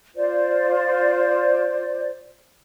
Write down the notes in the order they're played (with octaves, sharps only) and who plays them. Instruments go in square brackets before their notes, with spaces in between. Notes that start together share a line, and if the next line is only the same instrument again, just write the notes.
[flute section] F4 C5 D5